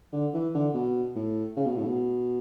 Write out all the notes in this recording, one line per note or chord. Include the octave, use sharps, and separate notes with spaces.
D3
E3
D3
B2
A2
C#3
B2
A2
B2